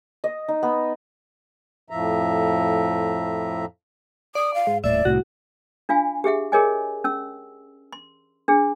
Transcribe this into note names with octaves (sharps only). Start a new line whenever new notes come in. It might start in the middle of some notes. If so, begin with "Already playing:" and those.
D#5
D#4
B3
F2 A2 F3 E5 A#5
D5 D#6
F5
G#2
D#1 A2 D5 E5
C2 A2 F#4
D4 F4 F5 G#5
G4 G#4 E5 F#5
G#4 A#4 C#5 D#5 F#5 G#5
C#4 E6
C6
D4 G#4